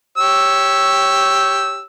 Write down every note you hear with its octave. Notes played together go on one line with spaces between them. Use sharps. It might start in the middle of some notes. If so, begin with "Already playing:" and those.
G4 C#5 E6